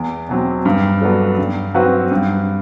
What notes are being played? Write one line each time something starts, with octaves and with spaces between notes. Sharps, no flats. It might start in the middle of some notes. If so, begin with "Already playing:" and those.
Already playing: E2
B2 F#3 C4
G2
F#3 B3 D4 A4
G2
F#3 C4 F#4 B4
G2